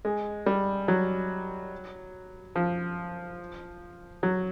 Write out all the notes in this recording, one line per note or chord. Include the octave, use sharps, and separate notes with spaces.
G#3
G3
F#3
F3
F#3